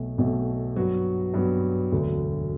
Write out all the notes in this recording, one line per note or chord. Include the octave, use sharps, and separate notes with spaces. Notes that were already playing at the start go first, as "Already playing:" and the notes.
Already playing: B1 B2 A3
B1 B2 A3
G2 F#3 B3 F#4
G2 F#3 B3 F#4
E1 D2 D3 F#3